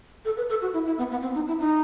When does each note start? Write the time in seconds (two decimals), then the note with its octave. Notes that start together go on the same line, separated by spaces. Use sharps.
0.25 A4
0.37 B4
0.49 A4
0.62 F#4
0.73 E4
0.86 E4
0.98 B3
1.11 B3
1.22 C4
1.35 D#4
1.48 E4
1.60 D#4